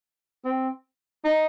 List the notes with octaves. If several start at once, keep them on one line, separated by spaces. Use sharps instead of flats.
C4
D#4